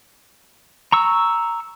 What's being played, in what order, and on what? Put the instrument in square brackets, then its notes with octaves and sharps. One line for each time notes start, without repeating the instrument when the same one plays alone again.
[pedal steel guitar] A#5 C#6 E6